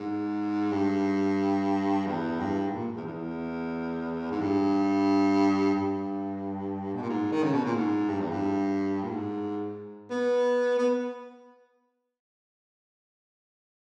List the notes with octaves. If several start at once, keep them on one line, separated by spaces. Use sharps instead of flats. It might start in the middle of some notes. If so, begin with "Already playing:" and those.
Already playing: G#2
G2
E2
G2
G#2
A#2
E2
E2
G#2
G2
G2
B2
A#2
G#2
D#3
C#3
B2
A#2
G#2
G2
E2
G2
A#2
G#2
B3
B3